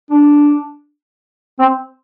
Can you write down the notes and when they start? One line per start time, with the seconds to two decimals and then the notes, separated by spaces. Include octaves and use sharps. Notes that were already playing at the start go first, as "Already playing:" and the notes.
0.11 D4
1.59 C4